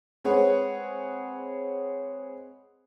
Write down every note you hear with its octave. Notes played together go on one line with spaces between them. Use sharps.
G#3 C4 G#4 B4 C#5 F#5